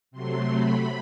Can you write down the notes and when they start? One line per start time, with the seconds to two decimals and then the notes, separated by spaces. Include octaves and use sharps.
0.11 C3 F#3 A3 C6
0.51 B5